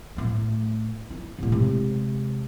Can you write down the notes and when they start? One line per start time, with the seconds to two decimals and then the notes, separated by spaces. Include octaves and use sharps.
0.16 A2 A3
1.10 E4
1.39 A2 C3
1.52 C3 G#3